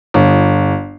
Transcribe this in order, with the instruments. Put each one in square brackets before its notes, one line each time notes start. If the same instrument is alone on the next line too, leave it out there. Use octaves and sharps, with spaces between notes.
[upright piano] G1